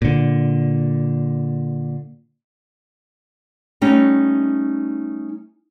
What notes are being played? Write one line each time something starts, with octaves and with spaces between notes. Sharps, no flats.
A#2 D3
G3 A3 C#4 D#4